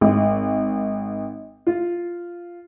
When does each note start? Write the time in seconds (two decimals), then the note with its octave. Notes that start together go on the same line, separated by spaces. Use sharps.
0.01 G#1
1.67 F4